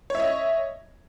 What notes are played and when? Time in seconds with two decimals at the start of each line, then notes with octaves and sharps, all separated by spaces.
0.10 C#5
0.15 E5
0.20 D#5